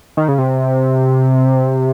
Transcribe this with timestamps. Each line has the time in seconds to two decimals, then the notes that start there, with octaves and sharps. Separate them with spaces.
0.17 D#3
0.28 C#3
0.38 C3